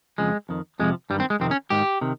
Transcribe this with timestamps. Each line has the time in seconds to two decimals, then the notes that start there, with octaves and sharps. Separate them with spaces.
0.18 F2 C#3 F3 G#3
0.49 F2 D#3
0.80 F2 C3 F3 G#3
1.10 G2 G3
1.15 D#3
1.20 C4
1.30 G#3
1.40 F2 C3 D#3 C4
1.51 C#4
1.70 G#2 D#3 G4
2.01 C3 D#3